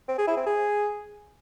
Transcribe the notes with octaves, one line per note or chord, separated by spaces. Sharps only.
C4
G#4
E4
C4
G#4